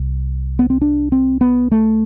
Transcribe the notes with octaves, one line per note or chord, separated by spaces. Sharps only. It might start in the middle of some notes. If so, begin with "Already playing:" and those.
Already playing: C2
B3
C4
D4
C4
B3
A3